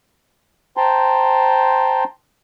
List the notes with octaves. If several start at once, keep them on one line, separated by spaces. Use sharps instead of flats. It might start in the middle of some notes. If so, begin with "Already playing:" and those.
C5 G5 A5 A#5 C6